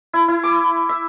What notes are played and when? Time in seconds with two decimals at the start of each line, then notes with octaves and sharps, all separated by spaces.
0.13 E4
0.28 E4
0.43 D6
0.89 E5